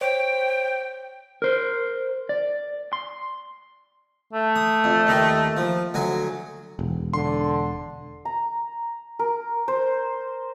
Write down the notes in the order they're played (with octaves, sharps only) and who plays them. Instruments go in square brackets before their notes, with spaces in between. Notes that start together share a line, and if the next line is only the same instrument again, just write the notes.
[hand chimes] C5 C#5 D7 [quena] G5
[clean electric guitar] A#4 C5
D5
C6
[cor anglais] A3
[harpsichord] D#6
F2
D#2 D#3 G3
F3
D2 F#3 G#5
[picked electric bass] E1
[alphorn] D3 [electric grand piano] C6
[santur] A#5
A#4
C5